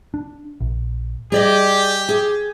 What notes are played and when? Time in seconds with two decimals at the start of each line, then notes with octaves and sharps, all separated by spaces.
0.14 D4
0.60 A#1
1.32 G3 G4 G#4 D5 D#5
2.09 G#4